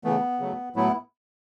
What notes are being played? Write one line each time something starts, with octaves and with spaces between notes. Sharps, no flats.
C#3 E3 A3 B3
C#3 F#3 A3
A2 F#3 A3 B3 E4